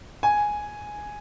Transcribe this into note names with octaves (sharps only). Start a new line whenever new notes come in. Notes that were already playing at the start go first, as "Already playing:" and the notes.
G#5